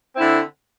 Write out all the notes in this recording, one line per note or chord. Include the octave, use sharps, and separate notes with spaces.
D3 C4 E4